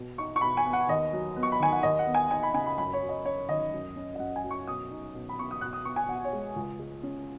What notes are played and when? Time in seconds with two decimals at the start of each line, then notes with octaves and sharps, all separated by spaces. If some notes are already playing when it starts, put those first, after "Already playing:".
Already playing: B2
0.18 D#4 C#6
0.36 C#6
0.41 B2 B5
0.57 G#5
0.66 B3
0.73 F#5
0.88 D#2 D#5
1.13 F#3
1.36 B3
1.43 C#6
1.52 B5
1.60 D#3 G#5
1.72 F#5
1.83 D#2 D#5
1.99 F#5
2.06 B3
2.14 G#5
2.31 D#4 G#5
2.43 B5
2.54 C#3 G#5
2.66 B5
2.78 F#2 B5
2.93 C#5
3.02 F#3
3.09 D#5
3.25 C#4 C#5
3.49 D#3 D#5
3.73 F#2
3.96 C#4
4.15 D#5
4.19 F#2 F#5
4.36 G#5
4.44 F#3
4.51 C#6
4.67 B2 D#6
4.91 D#4
5.15 B2
5.29 B5
5.38 B3 C#6
5.51 D#6
5.61 B2 F#6
5.73 D#6
5.84 B3 C#6
5.96 G#5
6.08 B2 F#5
6.24 C#5
6.33 G#3
6.56 C#2
6.79 G#3
7.03 C#4